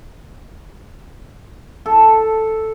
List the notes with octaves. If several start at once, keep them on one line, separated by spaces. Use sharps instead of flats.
A4